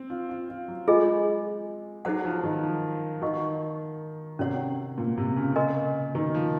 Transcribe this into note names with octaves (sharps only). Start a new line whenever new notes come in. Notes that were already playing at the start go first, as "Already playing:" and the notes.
Already playing: C4
F4
F4
F4
F#3
G#3 F4 G#4 D#5 G#5
F#3 D#4 G#4 C5 F#5
F3
D#3
F3
D#3 F#4 A#4 D#5 F#5 C#6
C3 C#4 F#4 C#5 F#5
A#2
C3
C#3
A#4 D#5 G#5 C6
D#3
F3